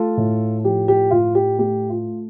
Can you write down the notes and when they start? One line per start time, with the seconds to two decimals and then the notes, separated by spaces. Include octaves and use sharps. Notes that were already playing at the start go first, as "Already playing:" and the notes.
Already playing: A3 F4 A4
0.17 A2
0.64 F3 G4
0.88 G4
1.11 A2 F4
1.35 G4
1.59 A3 G4
1.90 F4